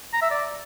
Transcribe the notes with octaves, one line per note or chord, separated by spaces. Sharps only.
A#5
E5
D5